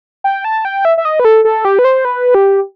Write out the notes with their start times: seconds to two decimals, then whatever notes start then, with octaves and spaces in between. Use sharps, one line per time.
0.24 G5
0.45 A5
0.65 G5
0.85 E5
0.98 E5
1.05 D#5
1.20 B4
1.25 A4
1.45 A4
1.65 G4
1.79 B4
1.84 C5
2.05 B4
2.35 G4